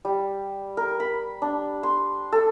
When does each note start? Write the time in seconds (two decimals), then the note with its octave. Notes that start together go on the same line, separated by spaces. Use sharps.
0.05 G3
0.77 A#4
1.00 B5
1.42 D4
1.83 C6
2.32 A4